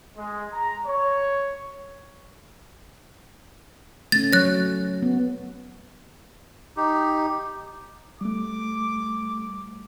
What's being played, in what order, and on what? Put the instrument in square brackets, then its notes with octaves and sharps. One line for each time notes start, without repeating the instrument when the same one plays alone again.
[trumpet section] G#3
A#5
C#5
[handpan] A3 C#4 [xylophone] A6
[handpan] F#3 C#5 [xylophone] F#6 A#6
[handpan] B3
[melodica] D#4 G4
[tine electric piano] G3 A3 [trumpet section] D6